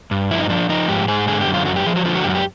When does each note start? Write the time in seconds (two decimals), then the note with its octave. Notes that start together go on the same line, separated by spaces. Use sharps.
0.11 G2
0.31 F3 E4
0.40 D#4
0.49 F3 D4
0.69 F3 D#4
0.88 G#2 G4
1.08 G#2 G#4
1.27 D3 G#4
1.41 G4
1.47 F#2
1.54 F4
1.66 F#2 F#4
1.76 G4
1.86 F3 G#4
1.96 F#4
2.05 D3 F4
2.15 F#4
2.24 F#2 G4
2.30 F#4
2.35 G4